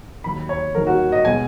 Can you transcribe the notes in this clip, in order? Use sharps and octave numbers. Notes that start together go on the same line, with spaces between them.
D#2 D#3 F#3 B5
C#5
D#2 D#3 F#3 A#4
F#4
D#5
B2 G#3 G#5